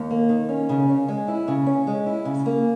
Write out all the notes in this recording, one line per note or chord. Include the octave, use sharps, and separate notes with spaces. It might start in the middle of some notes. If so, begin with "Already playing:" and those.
Already playing: D#2
A#3
D#3
C#4
C#3
C#4
G#3
E4
C#3
C#4
G#3
E4
C#3
A#3